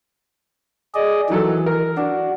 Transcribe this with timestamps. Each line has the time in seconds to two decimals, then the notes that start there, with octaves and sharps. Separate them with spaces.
0.95 G#4 D5 D#5
1.30 D#3 E3 F#3 A4
1.66 A#4
1.97 D4 F#4